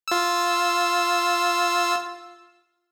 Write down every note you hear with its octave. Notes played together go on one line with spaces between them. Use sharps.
F4 E6